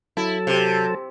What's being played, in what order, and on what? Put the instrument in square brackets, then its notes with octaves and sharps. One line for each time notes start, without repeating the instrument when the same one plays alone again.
[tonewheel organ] F#3 A4 A5 [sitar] E4
[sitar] C3